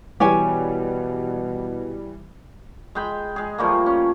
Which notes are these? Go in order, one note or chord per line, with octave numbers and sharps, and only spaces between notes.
B2 E3 G3 G4 C#5 G#5
G#3 G5 B5
G#3 G#4
F3 G3 A3 A#3
C#4